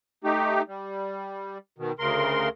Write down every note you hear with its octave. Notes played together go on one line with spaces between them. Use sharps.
A3 D#4 G4
G3
B2 D#3
D2 C#3 A#4 C6